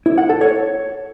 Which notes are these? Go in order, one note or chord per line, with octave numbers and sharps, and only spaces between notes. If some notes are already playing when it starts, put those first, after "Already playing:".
E4
F#5
A4
C#5